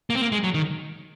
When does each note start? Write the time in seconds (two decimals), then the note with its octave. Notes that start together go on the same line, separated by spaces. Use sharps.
0.10 A#3
0.15 C4
0.22 A#3
0.32 G#3
0.44 F#3
0.54 D#3